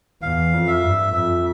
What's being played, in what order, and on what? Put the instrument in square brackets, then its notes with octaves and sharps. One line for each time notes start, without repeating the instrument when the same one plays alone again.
[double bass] E2 [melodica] F5
[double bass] F2
[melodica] E5
[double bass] G2
[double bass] F2 [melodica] E5